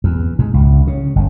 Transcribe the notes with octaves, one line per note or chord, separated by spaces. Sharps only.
E2
G#2
C#2
C#3
G1